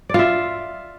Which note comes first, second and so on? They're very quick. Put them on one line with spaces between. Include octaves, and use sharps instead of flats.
D5 F4 E5